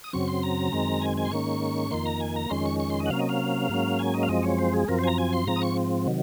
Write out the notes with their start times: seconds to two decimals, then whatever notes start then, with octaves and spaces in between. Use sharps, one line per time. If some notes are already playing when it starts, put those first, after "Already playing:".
0.04 D#6
0.13 F#2 C#3 F#3 C4 C#6
0.28 C6
0.43 A#5
0.72 F#2 D#3 G#3 C4
1.02 G#5
1.17 G#5
1.25 C6
1.31 G#2 D#3 A#3 C#4 C#6
1.91 F2 D#3 A#3 C6
2.05 A#5
2.20 G#5
2.36 A#5
2.50 F2 D#3 G#3 C#4 C6
2.66 C#6
2.80 C#6
2.90 C6
3.00 D#5
3.06 F#5
3.10 C3 F#3 A#3 C#4 F5
3.19 D#5
3.29 F5
3.69 G#2 F#3 A#3 C#4
3.99 G#5
4.14 D#5
4.23 F5
4.29 F#2 F3 G#3 C4 D#5
4.43 C#5
4.59 C5
4.73 G#4
4.88 F#2 F3 C4 A#4
4.99 C5 G#5
5.07 A#5
5.18 G#5
5.33 C6
5.47 G#2 F3 C4 A#5
5.56 D#6
5.62 C#6
6.07 C3 D#3 F#3